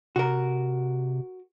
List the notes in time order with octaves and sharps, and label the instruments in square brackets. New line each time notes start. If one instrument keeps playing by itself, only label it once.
[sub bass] C3 [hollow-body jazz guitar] F#4 A#4